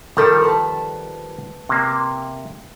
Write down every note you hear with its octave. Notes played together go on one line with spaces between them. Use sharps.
D#3 F3 G3 A4 A#4
B4 A5
C3 A#3